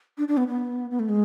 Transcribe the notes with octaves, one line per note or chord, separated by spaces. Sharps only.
D4
D4
B3
B3
B3
A3
G#3